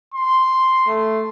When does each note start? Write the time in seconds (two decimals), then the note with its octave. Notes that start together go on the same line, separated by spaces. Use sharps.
0.15 C6
0.88 A3